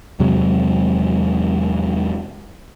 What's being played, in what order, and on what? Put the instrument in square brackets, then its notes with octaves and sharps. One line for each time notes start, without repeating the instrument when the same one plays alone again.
[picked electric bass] E2 C3 F#3 G#3